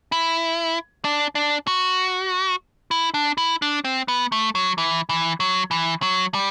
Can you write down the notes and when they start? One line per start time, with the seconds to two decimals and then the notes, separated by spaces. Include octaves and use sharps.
0.12 E4
1.05 D4
1.35 D4
1.67 F#4
2.91 E4
3.14 D4
3.38 E4
3.62 D4
3.85 C4
4.08 B3
4.32 A3
4.55 F#3
4.78 E3
5.09 E3
5.40 F#3
5.71 E3
6.02 F#3
6.34 G3